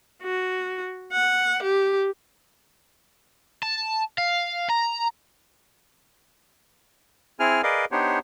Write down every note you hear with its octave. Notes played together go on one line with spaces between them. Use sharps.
F#4
F#5
G4
A5
F5
A#5
C4 E4 G#4 G#5 F6
G#4 A#4 B4 D5 D#5 F5
B3 D4 D#4 G4 C5 C#5